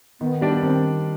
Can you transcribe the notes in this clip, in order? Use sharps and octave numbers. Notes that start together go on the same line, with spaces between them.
D#3 B3
G3 D4 G4 D5
B3
D#3 C4